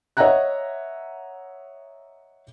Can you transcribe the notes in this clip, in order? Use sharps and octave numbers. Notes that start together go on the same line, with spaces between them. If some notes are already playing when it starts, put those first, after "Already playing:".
C#5 D#5 E5 F#5 A#5 F#6